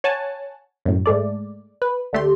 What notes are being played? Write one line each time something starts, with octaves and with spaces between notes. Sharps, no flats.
C#5 F#5 G#5 A5
F#2 A2
G#2 G#3 A3 D5
B4
D2 D3 A3 G4 C6